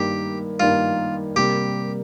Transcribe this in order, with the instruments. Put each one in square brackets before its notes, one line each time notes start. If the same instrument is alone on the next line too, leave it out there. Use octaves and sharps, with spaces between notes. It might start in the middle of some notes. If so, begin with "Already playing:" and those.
Already playing: [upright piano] G2 D#3 A#3 [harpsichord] G4
[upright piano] G2 D#3 A#3 [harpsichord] F4
[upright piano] C3 G3 A#3 [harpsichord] G4